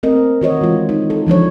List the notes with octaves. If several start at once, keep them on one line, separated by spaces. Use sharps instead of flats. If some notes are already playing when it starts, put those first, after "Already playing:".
A3 C4 A#4 D#5
D#3 F#4 C#5 D#5
E3 G#3 F4
D#4
A4
E3 F3 D4 C#5